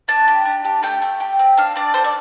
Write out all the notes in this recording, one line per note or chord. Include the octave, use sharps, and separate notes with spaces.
D4 A5
G4
D4
G4
A3 G5
A3
G4
C4
D4 F5
D4 D5
A4 C5
D5